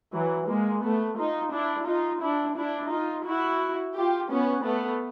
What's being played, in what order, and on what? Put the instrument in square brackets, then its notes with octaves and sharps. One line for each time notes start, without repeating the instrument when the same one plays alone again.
[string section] E3 F#3
G#3 A#3
A3 B3
D#4 F4
D4 E4
D#4 F4
D4 E4
D4 E4
D#4 F4
E4 F#4
F4 G4
B3 C#4
A3 B3